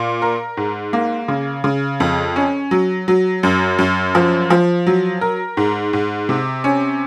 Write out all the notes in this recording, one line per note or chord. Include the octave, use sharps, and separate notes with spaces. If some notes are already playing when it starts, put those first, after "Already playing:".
Already playing: A#2
A#4
G#2
A#3
C#3
C#3
F2
C#4
F#3
F#3
F#2
F#2
F3
F3
F#3
A#4
G#2
G#2
C3
C#4